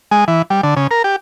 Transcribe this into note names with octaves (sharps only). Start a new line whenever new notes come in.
G#3
E3
G3
D3
C#3
A#4
G4